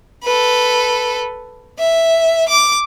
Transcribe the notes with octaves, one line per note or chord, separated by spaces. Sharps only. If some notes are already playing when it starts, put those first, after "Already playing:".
A4 B4
E5
D6